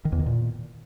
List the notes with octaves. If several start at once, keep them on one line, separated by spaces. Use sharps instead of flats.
D#3
E2
D#3
A#2